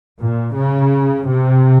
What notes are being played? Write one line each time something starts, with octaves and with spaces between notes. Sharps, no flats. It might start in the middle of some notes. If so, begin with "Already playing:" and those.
A#2
C#3
C3